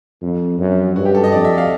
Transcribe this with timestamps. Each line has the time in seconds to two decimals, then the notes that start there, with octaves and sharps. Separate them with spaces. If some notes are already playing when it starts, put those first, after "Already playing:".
0.22 F2
0.59 F#2
0.96 G2 F#4
1.05 G4
1.15 A4
1.24 D#5
1.32 F2 D5
1.45 E5
1.58 F5